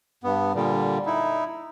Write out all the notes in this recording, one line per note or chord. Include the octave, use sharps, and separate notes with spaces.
G2 B3
A#2 D3 G3
D#4 E4